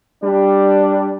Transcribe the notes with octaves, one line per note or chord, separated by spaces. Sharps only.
G3 D4